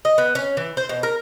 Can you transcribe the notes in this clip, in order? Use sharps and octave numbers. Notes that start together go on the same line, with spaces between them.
D#5
B3
C#4
E3
C5
B2
A#4